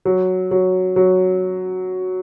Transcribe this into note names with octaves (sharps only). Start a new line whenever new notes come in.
F#3
F#3
F#3